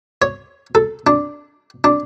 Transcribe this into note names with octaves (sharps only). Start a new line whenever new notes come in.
C#5
A4
D4
D4